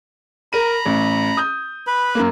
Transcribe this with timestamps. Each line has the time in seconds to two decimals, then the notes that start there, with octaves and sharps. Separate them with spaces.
0.53 A#4 A#5 B5 D#7
0.85 A1
1.37 D#6 G6
1.87 B4 B5
2.15 F#2 A#3